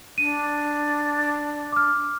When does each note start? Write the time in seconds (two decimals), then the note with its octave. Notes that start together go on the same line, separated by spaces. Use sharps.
0.18 D4 D#7
1.72 D6 F6